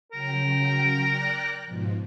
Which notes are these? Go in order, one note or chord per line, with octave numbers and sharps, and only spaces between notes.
C#3 F#3 A#4 G5
D5 G5 F#6
G#2 B2 F3